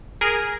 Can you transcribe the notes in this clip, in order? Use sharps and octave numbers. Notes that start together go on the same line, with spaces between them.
G#4 A#4